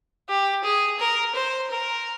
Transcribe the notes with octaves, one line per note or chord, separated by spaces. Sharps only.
G4
G#4
A#4
C5
A#4